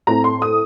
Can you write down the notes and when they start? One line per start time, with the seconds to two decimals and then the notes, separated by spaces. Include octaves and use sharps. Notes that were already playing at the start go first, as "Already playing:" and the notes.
0.07 A2 A3 C4 A#5
0.24 C6
0.42 D#6